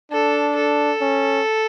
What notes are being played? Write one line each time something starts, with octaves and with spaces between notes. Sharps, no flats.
D4 A4
A4
C#4